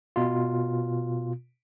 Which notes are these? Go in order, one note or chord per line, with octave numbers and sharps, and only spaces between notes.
B2 F4